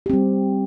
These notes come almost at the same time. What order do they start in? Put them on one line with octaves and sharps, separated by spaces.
G4 C4 G3